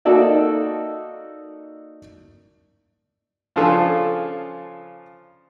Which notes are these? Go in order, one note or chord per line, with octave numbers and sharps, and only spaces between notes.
A#3 D#4 F#4 A4 D5 E5
C#3 F3 D4 F4 G#4 A4